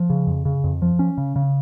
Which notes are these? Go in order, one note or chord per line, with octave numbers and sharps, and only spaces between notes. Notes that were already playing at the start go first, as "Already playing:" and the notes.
Already playing: F3
C#3
F2
C#3
F2
F3
C#4
C#3
C#3